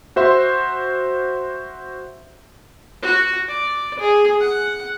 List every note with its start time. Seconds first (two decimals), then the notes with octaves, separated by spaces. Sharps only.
0.16 F#4 C5 E5 C6
3.02 F#4
3.47 D5
3.99 G#4
4.40 F#5